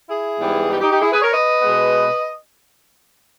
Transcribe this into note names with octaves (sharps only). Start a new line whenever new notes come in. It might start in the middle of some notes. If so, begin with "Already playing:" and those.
E4 G#4
G#2 E3 G3 B3
D#4 G4
D#4 G4
D#4 G4
E4 G#4
G#4 B4
A#4 C#5
B4 D#5
B2 G#3 B3